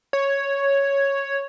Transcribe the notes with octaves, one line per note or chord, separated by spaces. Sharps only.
C#5